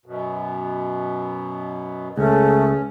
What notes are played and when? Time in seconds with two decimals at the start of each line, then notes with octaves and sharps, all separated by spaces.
0.06 F#2 B2
2.18 C#2 A3 C#4 G#4